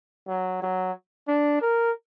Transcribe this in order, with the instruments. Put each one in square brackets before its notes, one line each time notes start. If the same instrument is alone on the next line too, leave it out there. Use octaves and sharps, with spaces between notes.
[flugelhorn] F#3
F#3
D4
A#4